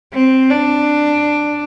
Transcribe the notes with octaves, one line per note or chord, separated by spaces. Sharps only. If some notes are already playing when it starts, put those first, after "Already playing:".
C4
D4